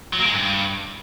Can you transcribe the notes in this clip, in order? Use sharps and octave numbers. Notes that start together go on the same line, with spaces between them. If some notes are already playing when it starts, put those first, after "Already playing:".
F#3
A#3
G#3
G2